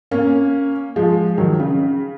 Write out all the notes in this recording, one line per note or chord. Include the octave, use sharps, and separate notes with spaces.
A#3 C#4
F3 G#3
D#3 F#3
C#3